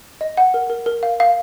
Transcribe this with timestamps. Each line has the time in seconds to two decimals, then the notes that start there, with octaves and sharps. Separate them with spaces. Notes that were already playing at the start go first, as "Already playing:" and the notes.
0.21 D#5
0.37 F#5
0.54 A#4
0.70 A#4
0.86 A#4
1.03 F5
1.20 F5